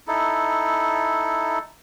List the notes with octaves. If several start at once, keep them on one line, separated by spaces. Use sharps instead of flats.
D#4 E4 A4